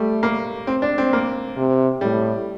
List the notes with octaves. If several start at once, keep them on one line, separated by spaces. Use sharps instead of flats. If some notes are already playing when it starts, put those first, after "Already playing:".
Already playing: G3 A3
A#3
C4
D4
C4
A#3
C3
A2 G3